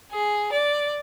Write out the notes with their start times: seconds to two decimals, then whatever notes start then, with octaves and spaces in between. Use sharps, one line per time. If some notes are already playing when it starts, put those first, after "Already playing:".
0.12 G#4
0.53 D5